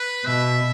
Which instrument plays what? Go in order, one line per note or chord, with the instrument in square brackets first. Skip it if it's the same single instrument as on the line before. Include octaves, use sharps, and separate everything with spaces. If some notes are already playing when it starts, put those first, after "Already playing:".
Already playing: [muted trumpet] B4
[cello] B2 [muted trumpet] E5